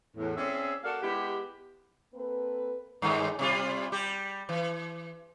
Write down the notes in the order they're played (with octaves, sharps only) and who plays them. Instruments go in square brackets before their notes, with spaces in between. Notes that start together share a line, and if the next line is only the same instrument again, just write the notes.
[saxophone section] E2 A2
C4 C#4 G#4 D5 E5
A#3 F#4 A4 A#4 D5 F5
G#3 B3 E4 G4
[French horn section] A#3 C4 A4 B4
[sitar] G2 D#3 G#3
C3 G3 F4
G3 G4
E3